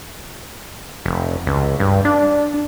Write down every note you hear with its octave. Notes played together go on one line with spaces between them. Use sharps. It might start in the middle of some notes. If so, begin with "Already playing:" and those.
F1
C#2
G2
D4